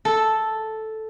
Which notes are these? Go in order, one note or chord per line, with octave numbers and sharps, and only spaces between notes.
A4